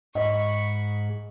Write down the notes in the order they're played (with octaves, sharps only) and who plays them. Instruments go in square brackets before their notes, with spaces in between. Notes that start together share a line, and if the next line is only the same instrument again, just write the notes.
[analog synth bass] G#2 [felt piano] D#5 [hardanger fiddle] B5 C#6